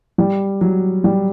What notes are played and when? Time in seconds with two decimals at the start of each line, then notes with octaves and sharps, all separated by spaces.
0.18 G3
0.61 F#3
1.04 G3